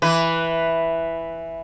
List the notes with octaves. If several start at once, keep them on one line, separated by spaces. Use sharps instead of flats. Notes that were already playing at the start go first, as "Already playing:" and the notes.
E3 B4